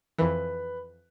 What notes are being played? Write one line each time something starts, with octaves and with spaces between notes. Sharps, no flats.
F2 E3 B4